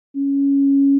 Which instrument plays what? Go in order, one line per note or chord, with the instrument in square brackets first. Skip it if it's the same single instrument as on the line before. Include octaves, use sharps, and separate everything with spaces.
[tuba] C#4